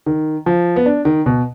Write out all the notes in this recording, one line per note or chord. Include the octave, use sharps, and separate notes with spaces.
D#3
F3
B3
D4
D#3
B2